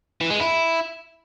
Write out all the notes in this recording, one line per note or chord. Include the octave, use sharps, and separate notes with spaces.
E3
G#3
E4